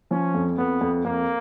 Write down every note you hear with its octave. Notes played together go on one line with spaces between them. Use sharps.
F3 C#4
F2
F2 B3
F2
F2 A#3